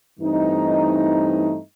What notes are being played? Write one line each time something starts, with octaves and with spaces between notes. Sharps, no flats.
G2 E3 A3 C4 D#4